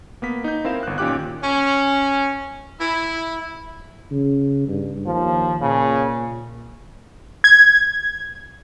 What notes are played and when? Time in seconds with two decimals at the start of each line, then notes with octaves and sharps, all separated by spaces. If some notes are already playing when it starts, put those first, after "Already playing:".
0.22 A#3 B3 B6
0.44 D#4 G6
0.65 C4 E4 A#4 F5 E7
0.83 G1 F#6
0.98 A#2 D#3 C#4 G4 D6 F#6
1.42 C#4
2.80 E4
4.11 C#3
4.68 G2
5.06 D#2 F3
5.61 A#2 C#3
7.44 G#6